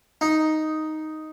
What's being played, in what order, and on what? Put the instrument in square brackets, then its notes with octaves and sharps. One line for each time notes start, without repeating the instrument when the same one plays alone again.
[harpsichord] D#4